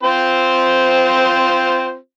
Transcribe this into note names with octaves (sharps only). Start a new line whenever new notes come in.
C4 F4 C5